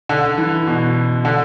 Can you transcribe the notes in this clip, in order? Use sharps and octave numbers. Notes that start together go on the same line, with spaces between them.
D3
E3
B2
D3